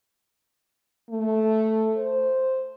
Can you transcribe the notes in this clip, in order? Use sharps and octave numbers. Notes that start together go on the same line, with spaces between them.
A3
C5